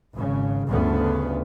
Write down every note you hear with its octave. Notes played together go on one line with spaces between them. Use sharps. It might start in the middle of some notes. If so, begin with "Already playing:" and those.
G#1 C#3
G1 D2 C#3 B3